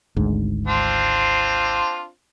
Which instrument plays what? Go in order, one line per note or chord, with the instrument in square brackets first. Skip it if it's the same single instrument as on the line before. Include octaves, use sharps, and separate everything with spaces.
[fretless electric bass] G#1 D2 G#2
[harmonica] C4 D4 F4